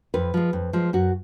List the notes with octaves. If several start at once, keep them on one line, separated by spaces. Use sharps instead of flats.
F2 B4
F3 G#3
F2
F3 G#3
F#2 F#4